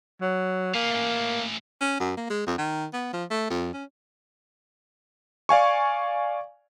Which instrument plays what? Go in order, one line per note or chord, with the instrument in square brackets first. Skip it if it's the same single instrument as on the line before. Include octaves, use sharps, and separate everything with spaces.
[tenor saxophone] F#3
[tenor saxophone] A#3 [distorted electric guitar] F5 G#5
[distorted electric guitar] A3 C#4
[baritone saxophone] C#4
F#2
A#3
G#3
F2
D#3
B3
F3
A3
F2
C#4
[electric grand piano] D5 F5 G#5 C#6